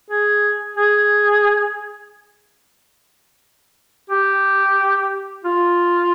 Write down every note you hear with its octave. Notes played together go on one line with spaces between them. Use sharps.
G#4
G#4
G4
F4